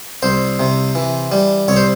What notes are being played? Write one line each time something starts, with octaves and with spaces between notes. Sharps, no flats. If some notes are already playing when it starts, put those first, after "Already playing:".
C2 C5
C3
E3
G3
C2 C#5
C5